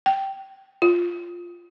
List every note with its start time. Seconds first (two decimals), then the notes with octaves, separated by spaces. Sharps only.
0.06 G5
0.82 F4